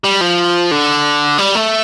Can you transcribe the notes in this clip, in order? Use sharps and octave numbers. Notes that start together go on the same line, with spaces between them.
G3
F3
D3
G3
A3